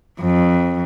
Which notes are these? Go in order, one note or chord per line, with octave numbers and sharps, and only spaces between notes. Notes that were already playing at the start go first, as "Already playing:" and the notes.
F2